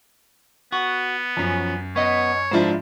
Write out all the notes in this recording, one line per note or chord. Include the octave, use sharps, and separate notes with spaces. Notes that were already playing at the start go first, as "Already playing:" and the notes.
B3 F#4
F#2 F3 C#4
B3 C#5 D#5
G#2 F3 D4 E4 C5